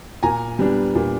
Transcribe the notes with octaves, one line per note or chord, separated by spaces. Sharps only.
A#2 G#5 A#5
G3 B3 D4
A#2